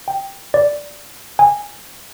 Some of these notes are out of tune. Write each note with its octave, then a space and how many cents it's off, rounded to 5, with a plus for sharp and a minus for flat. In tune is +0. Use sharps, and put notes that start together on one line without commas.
G5 +5
D5 -5
G#5 -15